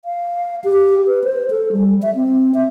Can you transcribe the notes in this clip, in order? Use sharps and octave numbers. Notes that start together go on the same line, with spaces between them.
F5
G4
B4
C5
A4
G3
E5
C4
E5